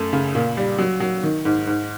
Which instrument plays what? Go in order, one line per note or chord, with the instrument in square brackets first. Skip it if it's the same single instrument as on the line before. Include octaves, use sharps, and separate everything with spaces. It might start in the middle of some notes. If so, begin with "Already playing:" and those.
Already playing: [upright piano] F#2 A3
C#3
A#2
G3
F#3
F#3
D#3
G#2
G#2